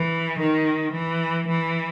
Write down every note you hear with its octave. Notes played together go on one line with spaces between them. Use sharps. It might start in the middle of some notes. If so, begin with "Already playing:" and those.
Already playing: E3
D#3
E3
E3